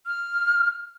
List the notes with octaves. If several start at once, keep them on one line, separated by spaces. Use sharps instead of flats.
F6